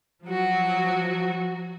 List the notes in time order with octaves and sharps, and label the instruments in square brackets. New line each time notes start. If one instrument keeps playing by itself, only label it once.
[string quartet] F3 F#3 F#4